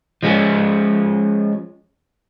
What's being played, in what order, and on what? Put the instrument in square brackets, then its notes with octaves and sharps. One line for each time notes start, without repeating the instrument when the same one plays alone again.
[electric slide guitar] F3 G#3 C#4